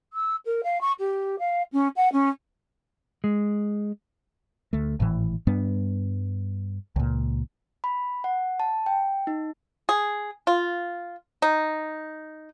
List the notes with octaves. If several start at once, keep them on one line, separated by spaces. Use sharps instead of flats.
E6
A#4
F5
C#6
G4
F5
C#4
F#5
C#4
G#3
D2 A3
G#1 A2 E3
G2 G3 B3 D4
C#2 A#2
B5
F#5
A5
G5
D#4
G#4
F4
D#4